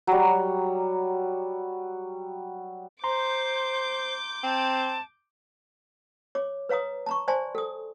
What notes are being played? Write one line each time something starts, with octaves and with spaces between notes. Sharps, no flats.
F#3 G3
C5 A#5 C6 D6 G6
C4 A5
C#5 D6
B4 C#5 F5 A#5 D#6
A5 A#5 C#6
C5 D5 G#5 A5 C6
A4 D#6